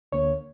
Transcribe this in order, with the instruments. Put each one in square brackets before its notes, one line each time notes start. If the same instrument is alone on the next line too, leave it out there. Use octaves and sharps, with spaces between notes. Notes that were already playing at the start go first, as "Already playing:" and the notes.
[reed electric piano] D2 D3 A#3 C#5